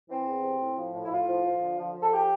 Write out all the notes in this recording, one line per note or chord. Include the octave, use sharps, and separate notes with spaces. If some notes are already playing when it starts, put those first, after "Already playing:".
E3 C4
E2
C3
A2
F3
A2
E4
A2 F4
F3
F3
D3
F3
F3
A4
G4